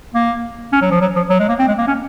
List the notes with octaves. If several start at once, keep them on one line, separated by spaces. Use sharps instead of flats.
A#3
C#4
F#3
F3
F#3
F3
F#3
G#3
A#3
C4
G#3
A#3
C#4